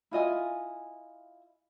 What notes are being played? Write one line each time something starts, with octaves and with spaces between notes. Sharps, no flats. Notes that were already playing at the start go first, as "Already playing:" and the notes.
E4 F4 D#5 G#5